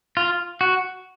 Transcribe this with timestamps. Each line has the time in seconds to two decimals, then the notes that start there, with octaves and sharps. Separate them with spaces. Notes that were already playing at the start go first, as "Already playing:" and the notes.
0.17 F4
0.61 F#4